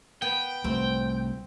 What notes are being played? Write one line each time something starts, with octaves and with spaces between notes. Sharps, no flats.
B3 G5
C2 C3 A3 C4